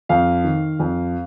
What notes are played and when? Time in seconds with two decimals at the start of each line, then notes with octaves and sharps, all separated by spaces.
0.09 F2 F5
0.44 D#3
0.80 F2